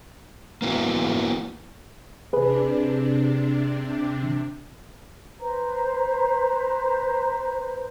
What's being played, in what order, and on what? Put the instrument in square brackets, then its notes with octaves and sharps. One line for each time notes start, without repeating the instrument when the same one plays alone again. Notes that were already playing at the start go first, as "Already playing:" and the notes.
[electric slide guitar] A#3 B3 E4 F#4
[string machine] C3 D4 [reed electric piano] G#4 B4
[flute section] B4 C5 A#5